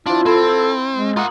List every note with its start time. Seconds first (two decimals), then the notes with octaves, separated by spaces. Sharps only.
0.06 F3 D4 E4 F4
0.26 C4 E4 A4
0.94 G#3
1.16 A#3 F4 F#5 D#6